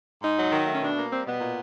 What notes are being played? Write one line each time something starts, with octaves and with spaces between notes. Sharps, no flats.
G#2 D#4
F#3
D#3
A3
C#4
B2 D4
A#3
G3 C4
B2 B3
A#2